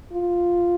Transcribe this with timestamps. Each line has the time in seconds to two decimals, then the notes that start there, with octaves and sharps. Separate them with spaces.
0.13 F4